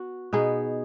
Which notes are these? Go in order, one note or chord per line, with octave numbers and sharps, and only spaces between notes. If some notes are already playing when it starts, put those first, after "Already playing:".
Already playing: B3 F#4
B2 B3 D#4 G#4